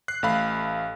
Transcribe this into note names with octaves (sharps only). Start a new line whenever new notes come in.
F#6 C7
A1 A3 F5 B5